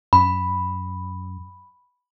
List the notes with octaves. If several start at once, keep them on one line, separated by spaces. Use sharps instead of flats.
F#2 B5